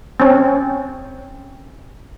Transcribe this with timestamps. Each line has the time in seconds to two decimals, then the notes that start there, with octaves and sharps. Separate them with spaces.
0.20 C4 C#4